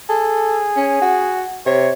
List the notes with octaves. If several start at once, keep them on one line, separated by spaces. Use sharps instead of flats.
G#4 A4
C#4
F#4
C3 C#5